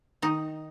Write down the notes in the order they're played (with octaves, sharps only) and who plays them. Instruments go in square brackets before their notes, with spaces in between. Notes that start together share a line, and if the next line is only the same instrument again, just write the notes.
[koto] D#3 D#4